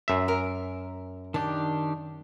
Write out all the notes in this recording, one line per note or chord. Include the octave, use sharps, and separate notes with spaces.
F#2 E5
A#4
D#3 D4 G4 A5